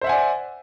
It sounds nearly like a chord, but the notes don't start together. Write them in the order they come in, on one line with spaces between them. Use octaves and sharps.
C5 E5 F#5 G#5 D5